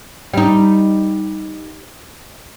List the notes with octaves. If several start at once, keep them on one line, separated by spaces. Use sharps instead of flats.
G3 D#4